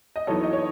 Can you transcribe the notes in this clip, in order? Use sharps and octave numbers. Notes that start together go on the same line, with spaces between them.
D#5
F#2 E3 B3 D#4 A4 C#5
D#5
C#5